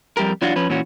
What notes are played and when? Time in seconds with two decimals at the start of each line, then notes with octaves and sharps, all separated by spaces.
0.17 F2 G3 G4 A#4
0.42 E3 F#3 D4 F4 F#4
0.56 F3 C#4 B4
0.69 A#2 E3 C#4 F#4